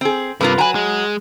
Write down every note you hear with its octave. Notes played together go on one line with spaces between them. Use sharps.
C4 G#4
G2 C3 F4 A#4 B4
F#3 A#4 B4 G#5
G#3